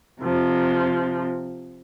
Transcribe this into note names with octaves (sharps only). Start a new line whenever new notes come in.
C3 F3